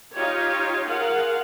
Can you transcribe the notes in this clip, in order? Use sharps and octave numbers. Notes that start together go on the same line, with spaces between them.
D#4 F4 G4 C#5
F4 G#4 A#4 F5 F#5